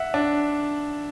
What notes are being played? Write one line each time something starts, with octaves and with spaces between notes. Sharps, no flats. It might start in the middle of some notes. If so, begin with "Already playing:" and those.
Already playing: E5 F#5
D4